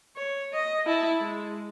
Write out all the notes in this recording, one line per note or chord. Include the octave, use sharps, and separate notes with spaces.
C#5
D#5
E4 A5
G#3